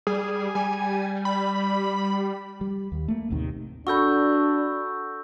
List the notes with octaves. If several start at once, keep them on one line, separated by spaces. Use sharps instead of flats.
G3 G#4
G3 G#5
B5
G3
D#2
A3 A#3
A1 D#2 C3 D#3
D4 F#4 A4 B5 C#6 E6 G6